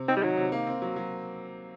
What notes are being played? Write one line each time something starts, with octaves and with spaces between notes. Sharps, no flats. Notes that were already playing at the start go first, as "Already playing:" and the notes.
Already playing: C3
C4 D#4
G3
D#3 F#3
C3
A#3
C4
F#3
F#3